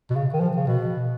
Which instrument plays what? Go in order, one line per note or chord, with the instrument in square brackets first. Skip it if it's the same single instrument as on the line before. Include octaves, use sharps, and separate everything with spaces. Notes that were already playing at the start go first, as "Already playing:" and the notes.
[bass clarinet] B2
C#3
D#3
F3
C#3
B2